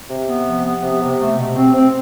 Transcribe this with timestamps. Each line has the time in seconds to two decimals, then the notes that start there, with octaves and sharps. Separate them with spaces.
0.10 C3
0.27 B3
0.47 F3
0.65 B3
0.83 C3
1.01 C3
1.20 A3
1.38 B2
1.56 C4
1.74 C4